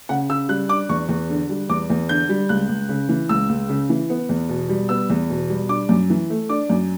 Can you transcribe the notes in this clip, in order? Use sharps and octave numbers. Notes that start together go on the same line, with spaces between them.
C#3 F#5
C#3 E6
G3 F#6
D4 D6
E2 C#6
E2
D3
G3
E2 D6
E2
D3 G6
G3
C#2 F#6
C#2
C#3
E3
C#2 E6
C#2
C#3
E3
B3
E2
B2
G3
B3 E6
E2
B2
G3
D4 D6
F#2
E3
A3
D4 D6
F#2